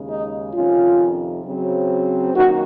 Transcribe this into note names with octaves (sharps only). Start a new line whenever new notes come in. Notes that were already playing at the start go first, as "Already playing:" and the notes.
Already playing: D#2 C#3 G#3
D#4
F2 C3 D#3 C#4 F4
C#3 F#3 C4
F#2 D#3 A#3 D#4 F#4